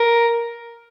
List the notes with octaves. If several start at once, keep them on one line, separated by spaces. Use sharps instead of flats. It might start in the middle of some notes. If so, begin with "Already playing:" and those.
Already playing: A#4